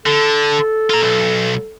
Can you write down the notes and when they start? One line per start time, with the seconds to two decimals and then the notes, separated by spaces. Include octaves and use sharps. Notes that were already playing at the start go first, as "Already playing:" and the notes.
0.06 D3 A4
0.90 F4 A#5
1.02 B1